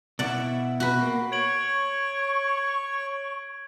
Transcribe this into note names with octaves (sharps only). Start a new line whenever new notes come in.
B2 E4 D5 F#5
F#4 B4
A#3
C#5 C#6 G#6 D7 F#7